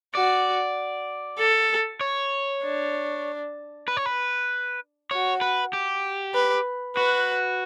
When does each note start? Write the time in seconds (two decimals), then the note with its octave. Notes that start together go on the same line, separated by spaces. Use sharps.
0.15 F#4 D5
1.39 A4
2.01 C#5
2.64 D4
3.88 B4
3.97 C#5
4.06 B4
5.11 F#4 C#5
5.41 B4
5.73 G4
6.34 B4
6.96 F#4 B4